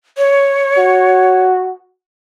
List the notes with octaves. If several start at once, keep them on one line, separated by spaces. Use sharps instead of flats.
C#5
F#4